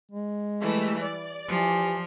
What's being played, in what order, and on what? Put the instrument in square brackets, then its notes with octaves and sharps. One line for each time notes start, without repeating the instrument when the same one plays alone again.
[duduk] G#3
[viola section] E3 G3 A3
D5
[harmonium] E3 [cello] F3 [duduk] G4